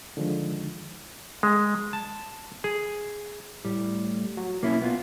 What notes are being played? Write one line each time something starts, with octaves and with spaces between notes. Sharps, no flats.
D3 D#3 F3 G#3 D#4
G#3
A5
G#4
A2 G3
F#3
B1 A#3 C#4 E4
B3 F4